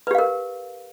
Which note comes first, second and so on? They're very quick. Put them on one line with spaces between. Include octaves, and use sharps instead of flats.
B4 G4 F5 A#4